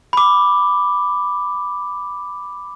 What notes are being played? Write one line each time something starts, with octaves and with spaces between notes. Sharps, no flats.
B5 D6